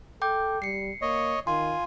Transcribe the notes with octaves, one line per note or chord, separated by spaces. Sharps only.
A4 G5 D6 G6
G3 C7 C#7
A#3 C#5 D#5
D#3 F4 G#5 C6